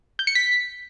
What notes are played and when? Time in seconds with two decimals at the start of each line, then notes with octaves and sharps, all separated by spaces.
0.19 G6
0.27 C#7
0.35 B6